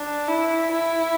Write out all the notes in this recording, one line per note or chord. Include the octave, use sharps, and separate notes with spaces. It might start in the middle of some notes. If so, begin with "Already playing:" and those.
Already playing: D4
E4
E4